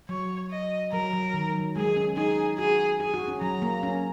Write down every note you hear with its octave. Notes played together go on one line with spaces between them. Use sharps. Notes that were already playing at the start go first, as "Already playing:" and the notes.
F#3 C#5
D#5
F#3 A#4
F#3
D#3
F#3
G#3 G#4
C#4
D#4 G#4
F#4 G#4
G#4 G#5
F#4
C#4
F#3 A#5
A#3
C#4